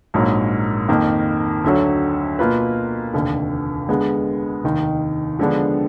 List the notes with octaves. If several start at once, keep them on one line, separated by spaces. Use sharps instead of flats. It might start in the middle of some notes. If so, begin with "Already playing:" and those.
A#1 G#2 F#3 A#3
F2 D#3 A#3
D2 D3 F#3
B2 A#3 F4 B4
F1 D#2 D3
D3 G#3 B3
F1 D#2 D#3
D3 F3 G#3 B3 D4